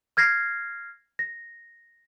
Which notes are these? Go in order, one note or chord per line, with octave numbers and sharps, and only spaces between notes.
F6 G#6 A#6 C7
A#6